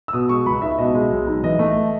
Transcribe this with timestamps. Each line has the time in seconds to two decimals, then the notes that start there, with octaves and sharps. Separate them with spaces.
0.08 E6
0.13 B2 D#6
0.29 G#3 C#6
0.46 C#2 B5
0.62 D#4 E5
0.78 B2 D#5
0.95 G#3
1.11 B1
1.27 D#4
1.44 E3 D#5
1.59 A3